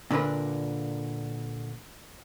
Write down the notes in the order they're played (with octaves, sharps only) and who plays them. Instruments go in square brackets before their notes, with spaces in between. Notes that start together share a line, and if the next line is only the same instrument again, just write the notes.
[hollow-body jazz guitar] A#2 D3 D4 A#4 B4